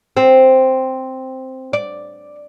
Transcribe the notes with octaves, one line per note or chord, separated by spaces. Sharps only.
C4
D5